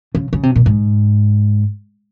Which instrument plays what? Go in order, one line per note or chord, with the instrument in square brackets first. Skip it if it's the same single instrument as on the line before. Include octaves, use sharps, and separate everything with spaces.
[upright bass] C#3
C#3
C3
A#2
G#2